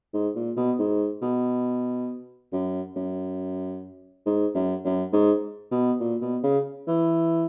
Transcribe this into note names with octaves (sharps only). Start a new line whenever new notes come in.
G#2
A#2
B2
G#2
B2
F#2
F#2
G#2
F#2
F#2
G#2
B2
A#2
B2
C#3
E3